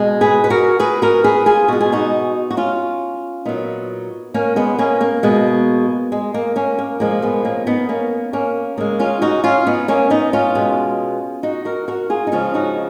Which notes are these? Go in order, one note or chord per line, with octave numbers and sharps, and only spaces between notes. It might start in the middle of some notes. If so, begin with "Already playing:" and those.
Already playing: B2 G#3
G#4 B4
B4
F#4 A#4
G#4 B4
F#4 A#4
G#4 B4
F4 G#4
B2 G#3 F#4
G#4
D#4 F#4
F#4
C#4 F4
A#2 F#3 B3 D#4
A#3 C#4
G#3 B3
A#3 C#4
A#3
B2 G#3
G#3
A#3
A#3 C#4
A#3
A#2 F3 G#3 A#3
G#3 B3
A#3 C#4
B3 D#4
A#3 C#4
A#3 C#4
C#3 G#3 A#3
C#4 F4
D#4 F#4
C#4 F4
B3 D#4
A#3 C#4
B3 D#4
C#4 F4
B2 G#3
D#4 F#4
F#4 A#4
F#4 A#4
F4 G#4
D#4
C#3 F3 G#3 C#4 F4
D#4 F#4